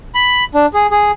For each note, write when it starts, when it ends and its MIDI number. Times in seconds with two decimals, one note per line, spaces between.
0.15 0.44 83
0.55 0.66 62
0.74 0.87 68
0.91 1.11 68